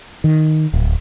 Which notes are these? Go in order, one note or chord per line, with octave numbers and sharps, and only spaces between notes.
D#3
D1